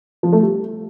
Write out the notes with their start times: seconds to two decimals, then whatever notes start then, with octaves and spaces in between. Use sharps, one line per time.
0.23 F3
0.33 A3
0.42 G3